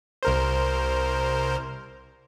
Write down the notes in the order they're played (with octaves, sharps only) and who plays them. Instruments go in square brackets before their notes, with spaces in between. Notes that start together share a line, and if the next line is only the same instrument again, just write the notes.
[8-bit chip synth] C2 A#4 C5